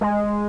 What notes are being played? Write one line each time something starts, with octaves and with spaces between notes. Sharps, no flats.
G#3